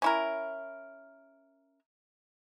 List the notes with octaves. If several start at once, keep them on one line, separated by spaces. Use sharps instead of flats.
C#4 E4 A#4